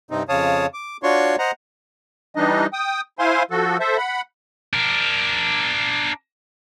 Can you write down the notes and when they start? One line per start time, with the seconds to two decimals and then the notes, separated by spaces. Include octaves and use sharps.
0.11 G2 C3 C4 D#4
0.29 F2 C#3 C#5 F5 A5 D#6
0.74 D6
1.03 D4 F4 F#4 C#5 C6 C#6
1.39 C5 D#5 F#5 A#5
2.35 E3 G3 D4 D#4 D#5
2.73 G5 D#6
3.19 E4 C5 F5 G#5 C6
3.51 F3 F#4 A4
3.80 A4 C5 E5
3.97 F#5 B5
4.73 D4 A#4